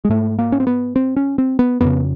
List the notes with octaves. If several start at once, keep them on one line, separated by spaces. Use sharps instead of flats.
G#3
G#2 A3
A#3
C#4
C4
B3
C4
C#4
C4
B3
F2 C#3 B3